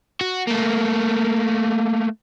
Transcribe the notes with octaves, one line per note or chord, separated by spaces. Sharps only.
F#4
A3 A#3